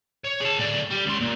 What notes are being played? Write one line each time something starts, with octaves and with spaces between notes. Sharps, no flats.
C#5
G#4 A5
A2 D5
G3 G4
C#2 C6
A#2